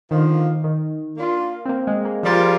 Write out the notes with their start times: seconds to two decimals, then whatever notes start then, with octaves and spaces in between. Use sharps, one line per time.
0.11 D3 D#3 F3 A#3 F4
0.64 D#3
1.17 A#3 D4 F4
1.65 C4
1.69 A#3
1.87 G#3
2.05 A#3
2.23 F3 G3 A#3 F4 G#4 D5